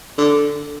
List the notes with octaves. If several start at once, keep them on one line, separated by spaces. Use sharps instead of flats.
D3